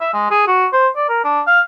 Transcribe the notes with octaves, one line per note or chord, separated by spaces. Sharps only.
E5
G#3
G#4
F#4
C5
D5
A#4
D4
F5